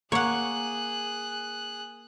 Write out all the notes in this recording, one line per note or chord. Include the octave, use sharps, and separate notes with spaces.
A#3 G#4 C#5 F#5 F#6